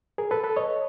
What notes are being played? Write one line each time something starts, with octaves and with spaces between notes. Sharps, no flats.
G#4 A#4
A4 B4
A4 B4
C#5 D#5